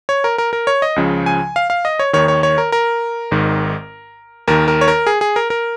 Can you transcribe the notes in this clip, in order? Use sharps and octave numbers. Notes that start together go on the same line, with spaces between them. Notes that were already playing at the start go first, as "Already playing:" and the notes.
C#5
A#4
A#4
A#4
C#5
D#5
C#2 C#3 F3
G#5
F5
F5
D#5
C#5
D#2 D#3 C#5
C#5
C#5
A#4
A#4
G#1 G#2 D#3
D#2 D#3 A#4
A#4
C#5
A#4
G#4
G#4
A#4
A#4